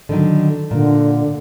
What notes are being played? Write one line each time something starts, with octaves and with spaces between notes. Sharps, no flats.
D3 D#3 F#3
A#2 D3